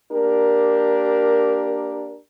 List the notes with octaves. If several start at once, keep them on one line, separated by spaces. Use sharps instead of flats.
A#3 D4 G4 A#4